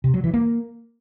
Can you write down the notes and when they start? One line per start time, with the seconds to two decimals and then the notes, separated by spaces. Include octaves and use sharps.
0.04 C3
0.14 F#3
0.24 E3
0.34 A#3